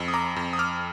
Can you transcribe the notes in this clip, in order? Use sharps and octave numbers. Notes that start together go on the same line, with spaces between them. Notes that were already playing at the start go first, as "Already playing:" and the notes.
Already playing: F2
D#6
A#5 D6
F2
D#6
D6 F6